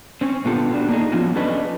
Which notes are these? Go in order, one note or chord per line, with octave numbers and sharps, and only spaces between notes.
C4 C#4
A#2 D3 B3 F4 G4 A4
B3 D4 F#4
A#3 D4 D#4 G#4
F3 A3 B3 C#4 F4 F#4
C#4 D4 G#4 A4 B4 D#5